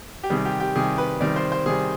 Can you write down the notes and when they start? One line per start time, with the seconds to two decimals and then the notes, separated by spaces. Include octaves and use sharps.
0.23 G4
0.30 C3 D#3 G3 G#4
0.45 G4
0.60 G4
0.75 C3 D#3 G3 G#4
0.98 B4
1.21 C3 D#3 G3 D5
1.36 C5
1.52 C5
1.66 C3 D#3 G3 G#4